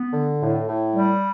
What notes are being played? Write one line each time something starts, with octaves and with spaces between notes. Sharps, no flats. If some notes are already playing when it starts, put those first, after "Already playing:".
Already playing: B3
D3
A2
A2
G3